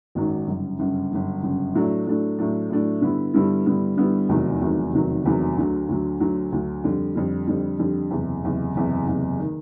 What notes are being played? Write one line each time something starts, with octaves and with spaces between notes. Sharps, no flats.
G#1 F#2 D#3 F#3
G1 F#2 C#3
G1 F#2 C#3
G1 F#2 C#3
G1 F#2 C#3
A2 F#3 A3 D4
A2 F#3 A3 D4
A2 F#3 A3 D4
A2 F#3 A3 D4
G2 D3 G3 B3 E4
G2 D3 G3 B3 E4
G2 D3 G3 B3 E4
G2 D3 G3 B3 E4
F1 E2 C3 D#3 F#3
F1 E2 C3 D#3 F#3
F1 E2 C3 D#3 F#3
F1 E2 C3 D#3 F#3
D2 D3 F#3
D2 D3 F#3
D2 D3 F#3
D2 D3 F#3
F2 D3 G3
F2 D3 G3
F2 D3 G3
F2 D3 G3
F#1 E2 C3
F#1 E2 C3
F#1 E2 C3
F#1 E2 C3
D#3